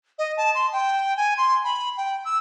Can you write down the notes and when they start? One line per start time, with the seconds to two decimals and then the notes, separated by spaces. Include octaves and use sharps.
0.19 D#5
0.37 A5
0.55 C6
0.73 G5
1.17 G#5
1.37 C6
1.64 B5
1.97 G5
2.25 E6